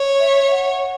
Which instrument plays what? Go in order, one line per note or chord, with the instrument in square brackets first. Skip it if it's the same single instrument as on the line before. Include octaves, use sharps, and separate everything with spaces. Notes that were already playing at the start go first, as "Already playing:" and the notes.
Already playing: [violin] C#5
[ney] E5
F#5